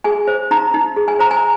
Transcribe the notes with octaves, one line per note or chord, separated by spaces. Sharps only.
G#4 G#5
C5
D#4 A#5
D#4
G#4
G#5
C5 A#5
G#5